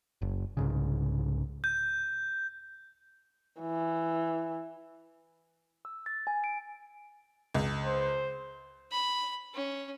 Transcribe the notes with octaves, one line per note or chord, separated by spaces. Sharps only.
F#1
C2 G#2 C#3
G6
E3
E6
A6
G#5
D7
C#2
C5
B5
C#4